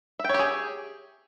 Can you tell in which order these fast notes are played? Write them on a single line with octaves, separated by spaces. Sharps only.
E5 G5 C#5 G4 G#4